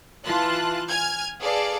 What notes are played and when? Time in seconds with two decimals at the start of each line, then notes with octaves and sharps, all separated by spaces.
0.24 E3 F4 A5 F#6
0.89 G#5 F6 G#6
1.41 G#4 A4 B4 D5 F5